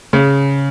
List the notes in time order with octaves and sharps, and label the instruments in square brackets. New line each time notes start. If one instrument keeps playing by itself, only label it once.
[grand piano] C#3